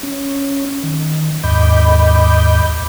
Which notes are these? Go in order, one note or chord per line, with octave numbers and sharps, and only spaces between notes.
C#4
D#3
D#2 G#2 D#5 B5 D6 G6